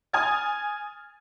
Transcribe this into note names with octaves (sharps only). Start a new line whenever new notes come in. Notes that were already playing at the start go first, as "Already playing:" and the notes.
G#5 D#6 F6 G#6 A6